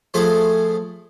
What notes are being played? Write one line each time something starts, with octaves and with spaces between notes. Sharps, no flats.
F3 A3 G#4 C5